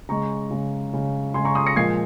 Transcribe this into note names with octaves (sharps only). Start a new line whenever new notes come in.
C#3 G#3 A#5 C#6
C#3 G#3
C#3 G#3
C#3 G#3 G#5 C6
A#5 C#6
C6 D#6
A#6 C#7
A#2 F3 G#3 G#6 C7